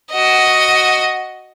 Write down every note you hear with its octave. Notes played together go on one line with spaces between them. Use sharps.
F#4 D#5